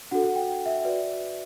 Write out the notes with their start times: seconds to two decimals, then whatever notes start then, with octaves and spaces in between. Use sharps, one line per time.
0.11 D4 F#4 A4 F#5
0.23 F#5
0.35 G5
0.66 E5
0.84 F#4 B4 D5